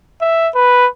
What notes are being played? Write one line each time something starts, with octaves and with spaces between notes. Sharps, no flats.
E5
B4